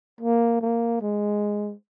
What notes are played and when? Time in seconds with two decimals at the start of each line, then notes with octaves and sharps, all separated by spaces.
0.21 A#3
0.61 A#3
1.02 G#3